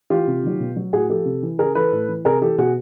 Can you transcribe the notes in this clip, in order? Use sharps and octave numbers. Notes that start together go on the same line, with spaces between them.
E3 F4 G4
C3
D#3 F#3
B2
F#3
A2 F#4 G#4
F3 G4 A4
C3
E3
C#3 G#4 A#4
E3 A4 B4
A2
E3
C3 G#4 A#4
E3 G4 A4
B2 F#4 G#4